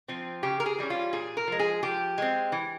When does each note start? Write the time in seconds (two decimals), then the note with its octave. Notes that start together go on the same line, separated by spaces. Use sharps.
0.08 F3 C4
0.43 C#3 G4
0.60 A#4
0.66 G#4
0.79 E3 G3 C#4
0.90 F4
1.13 A#2 G#4
1.37 A#4
1.47 F3 G#3
1.59 G#4
1.83 F3 G4
2.18 G#3 C4
2.52 E3